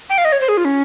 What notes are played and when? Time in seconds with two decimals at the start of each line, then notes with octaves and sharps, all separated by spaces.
0.10 G5
0.18 F5
0.25 D#5
0.32 C#5
0.41 C5
0.49 G#4
0.57 F4
0.65 C#4